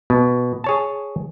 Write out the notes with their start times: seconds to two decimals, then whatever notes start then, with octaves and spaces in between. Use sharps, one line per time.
0.10 B2
0.64 G#4 C#5 A5